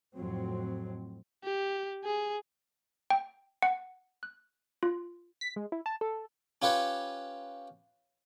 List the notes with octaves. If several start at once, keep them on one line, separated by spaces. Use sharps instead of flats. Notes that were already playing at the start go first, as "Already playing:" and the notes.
F2 A2 F#3 C4
G4
G#4
G5
F#5
F#6
F4
B6
G#3
E4
A5
A4
C#4 F4 G4 B4 C#5